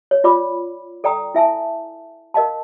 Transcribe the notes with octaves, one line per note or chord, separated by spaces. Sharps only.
C#5
F4 D5 B5 D6
A4 D5 G5 A#5 D#6
E4 E5 G#5 A5
A#4 D#5 F5 A5